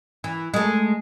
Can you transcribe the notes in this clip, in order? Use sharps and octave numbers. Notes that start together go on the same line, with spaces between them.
E3
G#3 A3